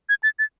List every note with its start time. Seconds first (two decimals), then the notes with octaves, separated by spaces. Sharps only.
0.09 G#6
0.23 A6
0.39 A6